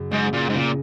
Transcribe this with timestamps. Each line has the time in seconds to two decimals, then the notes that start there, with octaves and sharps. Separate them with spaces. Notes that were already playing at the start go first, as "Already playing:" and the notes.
Already playing: F#2 C#3
0.11 F#1 G#2
0.33 A#2
0.49 G#2
0.54 A#2 C#3